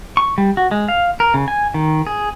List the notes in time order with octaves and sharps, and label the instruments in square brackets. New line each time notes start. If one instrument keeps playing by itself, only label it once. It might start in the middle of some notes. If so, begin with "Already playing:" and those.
[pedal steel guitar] C#6
G3
F#4
G#3
F5
A#4
C#3
G#5
D#3
G#4